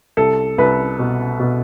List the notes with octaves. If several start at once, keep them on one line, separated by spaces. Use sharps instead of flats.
C2 A4
C2 B4
B2
B2